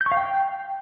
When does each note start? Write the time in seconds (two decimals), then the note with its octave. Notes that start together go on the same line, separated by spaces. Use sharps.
0.01 G6
0.06 C#6
0.12 F5
0.17 G5